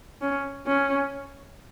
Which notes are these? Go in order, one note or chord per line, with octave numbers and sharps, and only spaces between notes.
C#4
C#4